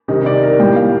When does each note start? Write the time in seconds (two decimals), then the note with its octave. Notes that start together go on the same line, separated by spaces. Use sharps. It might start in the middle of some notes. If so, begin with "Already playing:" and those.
0.08 C3 D#3 G3 D#5
0.26 D5
0.43 A#4
0.59 A2 G3 G5
0.76 F5